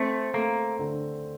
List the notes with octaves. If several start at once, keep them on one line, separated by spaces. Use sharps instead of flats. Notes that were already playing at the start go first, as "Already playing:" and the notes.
Already playing: A3 C4
A3 A#3
D3